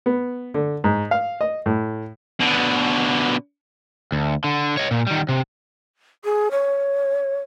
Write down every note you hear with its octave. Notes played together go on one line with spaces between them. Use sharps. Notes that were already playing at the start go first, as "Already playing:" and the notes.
B3
D3
G#2
F5
D#5
A2
B2 D3
D2
D3
C#5 D#5
A#2
D#3 G3
C3
G#4
C#5